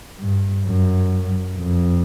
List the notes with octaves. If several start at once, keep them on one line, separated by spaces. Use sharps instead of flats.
G2
F#2
F2